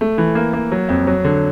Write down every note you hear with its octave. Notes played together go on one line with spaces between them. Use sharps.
A3
E3
A#3
A#3
F#3
F2
F#3
D3